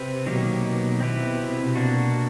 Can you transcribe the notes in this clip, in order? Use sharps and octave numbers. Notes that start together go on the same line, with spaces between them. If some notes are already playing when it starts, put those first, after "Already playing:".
Already playing: C3 C4 B4
B2 D#3 F#3 A#3 D#4 G4
B2
B2 C4 E4 G4 B4
C3
B2 A#3 D4 F#4